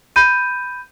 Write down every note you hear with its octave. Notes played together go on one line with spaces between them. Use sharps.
B5 G6 D#7